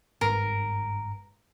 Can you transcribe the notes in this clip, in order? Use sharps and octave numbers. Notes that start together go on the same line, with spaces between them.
G1 G#2 A#4